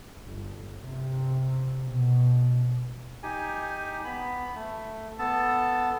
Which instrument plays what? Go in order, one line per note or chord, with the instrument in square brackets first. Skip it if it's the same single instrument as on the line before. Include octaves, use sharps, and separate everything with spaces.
[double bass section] G1
C3
B2
[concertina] D#4 G4 G#5
B3 B5
A3
B3 A4 A5